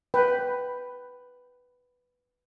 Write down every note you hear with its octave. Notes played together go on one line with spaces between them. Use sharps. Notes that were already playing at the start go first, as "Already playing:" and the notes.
B4 G5